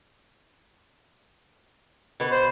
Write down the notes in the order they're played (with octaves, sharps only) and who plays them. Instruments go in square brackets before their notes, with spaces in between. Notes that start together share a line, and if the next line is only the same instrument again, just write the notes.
[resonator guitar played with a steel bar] B2 B4
[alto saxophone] C5